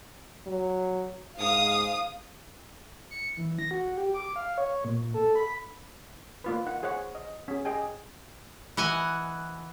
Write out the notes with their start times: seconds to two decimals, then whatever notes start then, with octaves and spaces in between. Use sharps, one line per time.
0.46 F#3
1.38 G#2 F5 D#6
3.11 C#7
3.37 E3
3.59 A#6
3.71 F#4
3.97 G4
4.14 D6
4.36 F5
4.58 C#5
4.84 A#2
5.14 A4
5.35 B5
6.44 A#3 F4 B4
6.66 D#4 F#5
6.83 G#4 C5 C#5 F#5
7.15 D#5
7.48 C#4 G#4
7.65 G#4 D#5 G5 G#5
8.77 E3 D#5 F#5 G#5